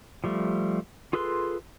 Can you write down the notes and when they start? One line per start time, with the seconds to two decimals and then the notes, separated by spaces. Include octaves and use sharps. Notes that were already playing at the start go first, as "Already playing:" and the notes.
0.24 F3 G3 A3
1.13 F4 G#4 A4 B4 C6